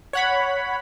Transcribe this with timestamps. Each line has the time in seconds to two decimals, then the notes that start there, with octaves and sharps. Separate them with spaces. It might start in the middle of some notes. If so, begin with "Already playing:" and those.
0.13 C#5 F#5 B5